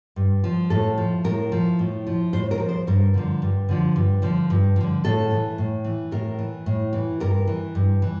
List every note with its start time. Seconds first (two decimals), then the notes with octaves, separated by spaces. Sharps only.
0.16 G2
0.44 F3
0.70 A2 A4
0.98 F3
1.24 A2 A#4
1.52 F3
1.79 A2
2.07 F3
2.33 A2 C5
2.51 A#4
2.60 F3
2.69 C5
2.87 G2 A#4
3.14 D3 F3
3.42 G2
3.69 D3 F3
3.96 G2
4.22 D3 F3
4.50 G2
4.76 D3 F3
5.04 A2 A4
5.31 E3
5.58 A2
5.84 E3
6.11 A2 A#4
6.39 E3
6.66 A2
6.93 E3
7.20 G2 A#4
7.47 E3
7.75 G2
8.02 E3